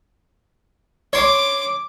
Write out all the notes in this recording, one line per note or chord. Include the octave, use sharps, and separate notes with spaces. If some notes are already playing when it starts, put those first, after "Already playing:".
C#5 C6 D6